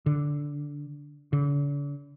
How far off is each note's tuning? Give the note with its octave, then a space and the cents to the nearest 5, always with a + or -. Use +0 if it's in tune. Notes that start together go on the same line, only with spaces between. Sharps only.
D3 -10
D3 -45